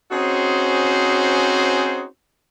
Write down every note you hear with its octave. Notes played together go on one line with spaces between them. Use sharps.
C4 C#4 D#4 F#4 G#4 C5